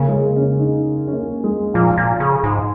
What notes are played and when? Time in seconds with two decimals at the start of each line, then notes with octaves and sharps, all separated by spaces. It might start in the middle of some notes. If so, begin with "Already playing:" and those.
Already playing: C#3 A#3
0.08 G#3
0.13 A#3
0.36 C#4
0.59 D#4
1.08 C#4
1.13 A#3
1.44 G#3
1.74 A#2 F3
1.98 A#2
2.20 C#3
2.44 G#2